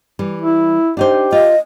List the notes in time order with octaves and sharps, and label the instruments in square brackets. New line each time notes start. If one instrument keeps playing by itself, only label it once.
[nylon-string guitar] E3 G3
[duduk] E4
[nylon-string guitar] D4 D#4 C5 [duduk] G4
[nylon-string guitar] F4 [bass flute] D#5